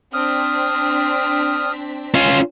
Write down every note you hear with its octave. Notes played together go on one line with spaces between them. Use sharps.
C4 D4 D#6 F6 B6
C#4 F4